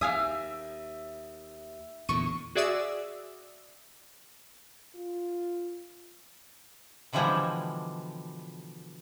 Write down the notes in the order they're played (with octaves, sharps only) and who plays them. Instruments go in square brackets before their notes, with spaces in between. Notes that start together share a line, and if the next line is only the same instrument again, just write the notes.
[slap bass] D#2 [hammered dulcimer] E5 [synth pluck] F5 G#5 D#6
[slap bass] E2 A#2 D3 [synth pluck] C#6 D#7
[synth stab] F#4 G#4 D5 E5 D#6 E6
[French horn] F4
[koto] B2 D3 E3 F3 G3 G#3